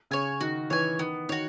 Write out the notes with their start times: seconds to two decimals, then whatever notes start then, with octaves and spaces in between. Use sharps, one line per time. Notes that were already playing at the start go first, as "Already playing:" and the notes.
0.11 C#3 C#5 G#5
0.41 D#3 F#4
0.70 E3 C#5 G#5
0.99 D#3 B3
1.29 D#3 F#4 C#5